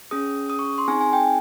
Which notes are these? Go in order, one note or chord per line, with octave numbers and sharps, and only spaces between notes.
C#4 G#4 D#6
D#6
C#6
C6
C4 D#4 G#4 G#5
G#5
G5